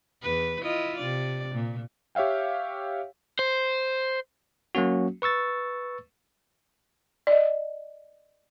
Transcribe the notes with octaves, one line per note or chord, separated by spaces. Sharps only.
E2 B4
E4 F4 D#5
C3 D5
A#2
G4 C#5 E5 F5 G5
C5
F#3 A#3 C#4 F#4
B4 C#6 E6 A6
D5 D#5